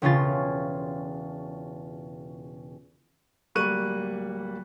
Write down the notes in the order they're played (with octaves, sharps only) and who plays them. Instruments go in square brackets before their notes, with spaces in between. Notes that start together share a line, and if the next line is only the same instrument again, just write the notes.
[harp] E1 C#3 C#4 F4 A6
[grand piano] D1 G3 A#3 C#6 F#6 D#7